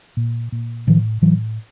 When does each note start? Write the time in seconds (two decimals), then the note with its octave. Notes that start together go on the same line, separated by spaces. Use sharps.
0.17 A#2
0.52 A#2
0.87 A2 D#3 F3
1.22 A2 E3 F#3